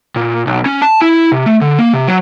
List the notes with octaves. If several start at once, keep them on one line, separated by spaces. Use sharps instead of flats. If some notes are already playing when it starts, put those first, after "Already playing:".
A#2
B1
C#4
A5
E4
C3
A3
D3
A#3
C3
F#3